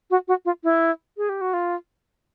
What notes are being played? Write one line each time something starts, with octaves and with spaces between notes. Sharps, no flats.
F#4
F#4
F4
E4
G#4
G4
F#4
F4